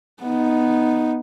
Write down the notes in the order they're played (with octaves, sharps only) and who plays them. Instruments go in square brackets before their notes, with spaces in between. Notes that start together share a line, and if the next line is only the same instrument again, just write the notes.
[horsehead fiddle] B3 D#4